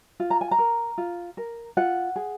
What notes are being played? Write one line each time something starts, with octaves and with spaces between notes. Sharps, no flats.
F4
A#5
G#5
A#5
A#4
F4
A#4
F4 F#5
G#4